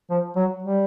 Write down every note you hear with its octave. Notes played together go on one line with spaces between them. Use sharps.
F3
F#3
G3